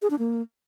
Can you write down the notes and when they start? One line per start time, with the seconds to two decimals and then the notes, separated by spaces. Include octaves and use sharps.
0.02 G#4
0.10 D4
0.19 A#3